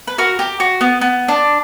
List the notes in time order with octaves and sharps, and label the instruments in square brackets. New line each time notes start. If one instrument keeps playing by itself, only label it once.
[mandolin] B4
F#4 A#4
G4
F#4
B3
B3
D4